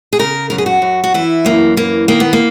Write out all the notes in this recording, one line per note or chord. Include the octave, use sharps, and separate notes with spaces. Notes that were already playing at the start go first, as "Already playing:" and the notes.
G#4
C#3 A#4
F#2 A#4
G#4
F#4
F#2
F#4
E3 E4
F#2 A#3
E3 A#3
D#3 A#3
B3
A#3